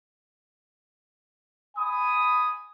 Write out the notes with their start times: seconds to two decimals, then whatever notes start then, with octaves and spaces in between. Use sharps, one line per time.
1.77 G#5 B5 D#6